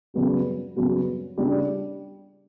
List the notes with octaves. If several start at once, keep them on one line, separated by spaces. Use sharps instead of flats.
F#2 C#3 G3 B3 F#4
F#2 C#3 G3 B3 F#4
C#3 G3 D4 G4